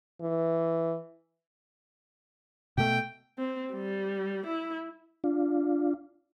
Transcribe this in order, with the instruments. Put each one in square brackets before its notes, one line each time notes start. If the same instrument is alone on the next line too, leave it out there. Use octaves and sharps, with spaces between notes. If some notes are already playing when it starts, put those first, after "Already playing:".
[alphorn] E3
[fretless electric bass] B2 A3 [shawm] G5
[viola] C4
G3
E4
[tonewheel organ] D4 F4